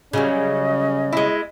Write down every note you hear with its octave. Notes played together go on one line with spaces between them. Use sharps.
C#3 F#3 G3 C#4 D#5
G#3 E4